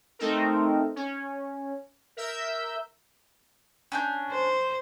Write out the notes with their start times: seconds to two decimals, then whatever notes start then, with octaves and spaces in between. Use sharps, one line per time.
0.19 A3 C4 D#4 A4 A#4
0.96 C#4
2.17 A#4 E5 E6 G6
3.92 C#4 D4 G6
4.30 C5